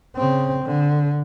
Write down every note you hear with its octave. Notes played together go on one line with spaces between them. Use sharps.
C#3 C4
D3